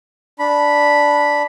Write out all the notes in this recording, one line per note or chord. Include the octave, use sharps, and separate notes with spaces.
D4 B5